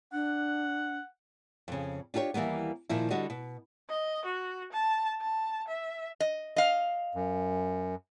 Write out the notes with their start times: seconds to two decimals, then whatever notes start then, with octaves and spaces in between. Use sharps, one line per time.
0.13 D4 F#5
1.68 F2 C#3
2.14 D4 F4 G4 A4 C#5
2.34 D#2 E3 G3 A#3 B3
2.89 A#2 D#3 F3 E4
3.10 D3 G3 F#4 D#5
3.30 B2
3.89 D#5
4.25 F#4
4.72 A5
5.21 A5
5.68 E5
6.20 D#5
6.56 D#5 F5
7.15 F#2